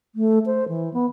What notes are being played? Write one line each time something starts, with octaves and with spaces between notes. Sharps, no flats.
A3
C5
E3
B3